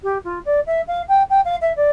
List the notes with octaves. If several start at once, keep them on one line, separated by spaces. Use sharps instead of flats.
G4
F4
D5
E5
F5
G5
G5
F5
E5
D5